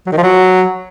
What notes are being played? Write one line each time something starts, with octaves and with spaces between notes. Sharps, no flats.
F#3
D#3
F3
F#3